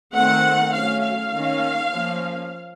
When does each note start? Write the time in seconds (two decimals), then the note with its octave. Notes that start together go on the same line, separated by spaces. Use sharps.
0.15 D#3 A3 C4 F#5
0.73 F#3 A3 C#4 F5
1.04 F5
1.33 D#3 A#3 C#4
1.91 F3 A#3 C#4